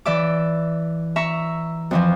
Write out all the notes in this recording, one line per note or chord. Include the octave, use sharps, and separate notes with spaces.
E3 D5 E5 D6
E5 A#5 C#6
F2 E3 F3